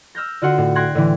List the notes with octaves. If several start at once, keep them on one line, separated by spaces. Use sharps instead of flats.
E6 F6 G6 A#6
D3 F4 F#4 F#5 C6
A2
G5 C6 F#6 G#6 A#6
A2 D3 E3